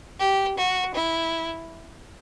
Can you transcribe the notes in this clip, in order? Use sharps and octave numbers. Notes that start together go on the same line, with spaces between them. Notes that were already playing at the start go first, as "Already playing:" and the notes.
G4
F#4
E4